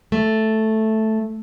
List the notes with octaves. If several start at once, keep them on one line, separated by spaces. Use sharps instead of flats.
A3